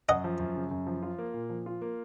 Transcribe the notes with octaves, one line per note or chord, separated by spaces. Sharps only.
F#2 D#5 F#5
F3
F#2
C#3
F#2
F3
F4
A#3
A#2
F3
F4
A#3